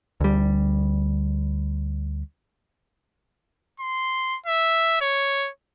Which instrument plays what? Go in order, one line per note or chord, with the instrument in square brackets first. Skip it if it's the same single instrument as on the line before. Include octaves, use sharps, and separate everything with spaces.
[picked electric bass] D2 G3
[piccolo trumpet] C6
E5
C#5